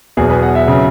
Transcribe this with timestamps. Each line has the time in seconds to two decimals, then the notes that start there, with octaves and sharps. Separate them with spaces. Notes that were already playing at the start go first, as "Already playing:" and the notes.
0.17 E2 B2 F#3 B3 G#4
0.30 B4
0.43 F#5
0.55 E5
0.68 C#3 F#3